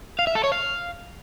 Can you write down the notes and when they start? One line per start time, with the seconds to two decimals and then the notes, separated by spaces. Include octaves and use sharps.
0.19 F5
0.27 E5
0.35 A4
0.44 C#5
0.52 F5